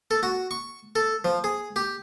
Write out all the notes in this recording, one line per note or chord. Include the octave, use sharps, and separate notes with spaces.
A4
F#4
C#6
A4
F3
G#4
G4